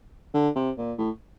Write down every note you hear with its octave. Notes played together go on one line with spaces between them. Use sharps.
D3
C3
A#2
A2